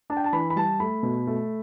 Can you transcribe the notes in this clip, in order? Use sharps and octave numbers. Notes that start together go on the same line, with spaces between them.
D4 A5
G5
A5
E3 B5
B5
G3 A5
A3 B5
B2
A3